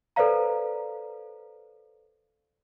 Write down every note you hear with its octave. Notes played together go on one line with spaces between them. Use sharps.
A4 B4 C5 D5 F5 A#5